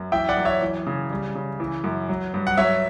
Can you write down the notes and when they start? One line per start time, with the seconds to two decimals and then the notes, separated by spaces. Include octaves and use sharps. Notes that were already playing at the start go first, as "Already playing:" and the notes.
Already playing: F#2
0.12 E3 E5 G5
0.29 D5 F#5
0.37 F#2
0.45 C#5 E5
0.61 E3
0.87 C#3
1.11 G3
1.35 C#3
1.60 E3
1.84 F#2
2.09 F#3
2.34 G2
2.47 F#5
2.57 F#3 C#5 E5